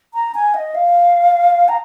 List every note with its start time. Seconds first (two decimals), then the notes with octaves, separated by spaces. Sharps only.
0.14 A#5
0.35 G#5
0.54 D#5
0.75 F5
1.69 A#5